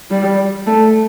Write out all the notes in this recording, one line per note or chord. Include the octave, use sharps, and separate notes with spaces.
G3
A3